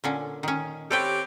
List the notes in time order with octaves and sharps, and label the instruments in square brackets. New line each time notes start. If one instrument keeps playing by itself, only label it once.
[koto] A#2 D3 C#4
D#3 C#4
[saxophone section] C4 C#4 G4 [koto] A4 B4 G5